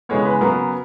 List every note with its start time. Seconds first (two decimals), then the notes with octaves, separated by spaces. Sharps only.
0.09 C#3 E3 G#3 B3 C#5
0.25 B4
0.41 C#3 F#3 B3 A#4